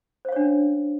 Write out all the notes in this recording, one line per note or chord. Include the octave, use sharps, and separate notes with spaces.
C#4 D4 C5 C#5 F5